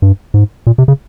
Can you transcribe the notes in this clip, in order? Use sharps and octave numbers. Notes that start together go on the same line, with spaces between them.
G2
G#2
A#2
C3
C#3